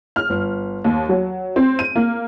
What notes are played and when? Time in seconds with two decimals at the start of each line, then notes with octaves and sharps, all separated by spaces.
0.16 F6
0.30 G1
0.84 D#2
1.09 F#3
1.56 C4
1.79 D#7
1.95 A#3